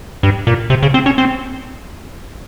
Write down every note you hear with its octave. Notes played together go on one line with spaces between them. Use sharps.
G2
A#2
C3
C#3
C4
C#4
C4